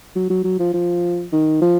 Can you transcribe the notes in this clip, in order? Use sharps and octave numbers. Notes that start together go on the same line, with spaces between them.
F#3
F#3
F#3
F3
F3
D#3
F3